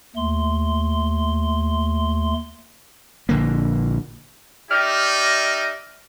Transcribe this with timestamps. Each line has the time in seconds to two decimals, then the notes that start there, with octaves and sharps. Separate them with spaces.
0.16 D#2 A3 C6
3.29 A#1 D3 A#3
4.71 D#4 G4 D5 E5 F6